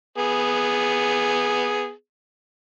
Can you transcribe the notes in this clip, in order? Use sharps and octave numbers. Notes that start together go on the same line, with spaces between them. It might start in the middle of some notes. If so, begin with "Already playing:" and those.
B3 G#4